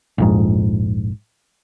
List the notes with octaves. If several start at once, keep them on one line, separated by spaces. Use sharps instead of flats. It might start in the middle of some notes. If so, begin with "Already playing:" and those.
A#1 F2 G#2